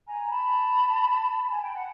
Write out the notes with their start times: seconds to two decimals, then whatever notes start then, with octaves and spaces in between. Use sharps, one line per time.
0.07 G#5 A#5
0.30 A5 B5
1.50 G#5
1.61 G5
1.73 F#5